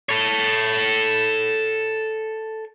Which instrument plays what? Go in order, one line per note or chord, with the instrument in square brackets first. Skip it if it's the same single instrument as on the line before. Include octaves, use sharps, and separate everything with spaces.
[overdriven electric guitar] A4 C#5